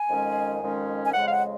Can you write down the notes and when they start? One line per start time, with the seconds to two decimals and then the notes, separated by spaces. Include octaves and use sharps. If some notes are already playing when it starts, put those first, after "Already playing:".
Already playing: G#5
0.09 F2 D#3 G#3 C#4
0.61 F2 D#3 G#3 C#4
1.07 G#5
1.14 F2 C#3 G#3 F#5
1.27 F5
1.31 F#5